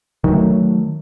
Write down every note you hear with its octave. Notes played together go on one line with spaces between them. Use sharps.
D#3 F#3 A3